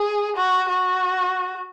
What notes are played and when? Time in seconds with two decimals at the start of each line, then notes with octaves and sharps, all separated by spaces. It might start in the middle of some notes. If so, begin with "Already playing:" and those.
Already playing: G#4
0.36 F#4
0.69 F#4